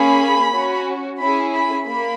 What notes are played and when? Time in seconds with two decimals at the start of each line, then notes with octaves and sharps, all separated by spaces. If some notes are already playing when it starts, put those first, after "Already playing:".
Already playing: A#3 C#4 G#4 B5
0.52 C#4 F#4
1.19 C#4 E4 G#4 B5
1.52 B5
1.86 A#3 B5